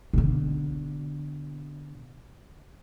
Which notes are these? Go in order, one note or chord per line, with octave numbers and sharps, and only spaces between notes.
B2 D3